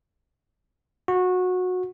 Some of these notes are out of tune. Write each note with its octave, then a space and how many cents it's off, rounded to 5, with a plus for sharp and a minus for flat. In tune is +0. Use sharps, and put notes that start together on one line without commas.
F#4 -20